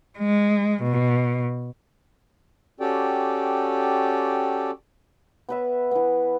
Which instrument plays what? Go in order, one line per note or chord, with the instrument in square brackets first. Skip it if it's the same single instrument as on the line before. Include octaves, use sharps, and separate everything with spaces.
[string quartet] G#3
B2
[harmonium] C#4 F#4 G4 A4 D5 G5
[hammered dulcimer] B3 B4 E5
E3 B3